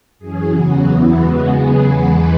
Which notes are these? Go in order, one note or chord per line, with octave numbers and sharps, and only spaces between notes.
F#2 E3 C#4 G#4
E2 C#3 F#3 B3 F#4
E2 E3 B3 E4
C#3 G#3 B3 F#4
C#3 F#3 B3 G#4
E2 E3 G#3 B4